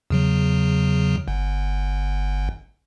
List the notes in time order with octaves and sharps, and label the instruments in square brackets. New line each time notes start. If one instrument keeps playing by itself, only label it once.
[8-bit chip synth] E2 C#3 F#3
G1